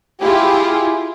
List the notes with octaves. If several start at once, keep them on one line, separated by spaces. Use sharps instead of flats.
E4 F4 G4 G#4